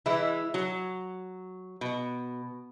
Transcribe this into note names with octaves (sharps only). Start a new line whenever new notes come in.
E3 G#3 E4
F#3
B2